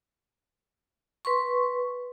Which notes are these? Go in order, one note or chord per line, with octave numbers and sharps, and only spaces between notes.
B4 C6 C#6